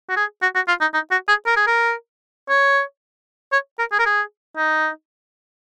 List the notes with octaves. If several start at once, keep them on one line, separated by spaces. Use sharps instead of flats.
F#4
G#4
F#4
F#4
F4
D#4
D#4
F#4
G#4
A#4
G#4
A#4
C#5
C#5
A#4
G#4
A#4
G#4
D#4